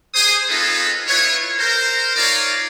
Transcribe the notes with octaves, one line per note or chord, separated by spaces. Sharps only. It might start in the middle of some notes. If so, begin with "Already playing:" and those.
G#4 C5 D#6
C4 D#4 F4 G#4 A4 B4
E4 F4 B4 C#5
A#4 C5
D#4 F4 A#4 C#5 D5 F5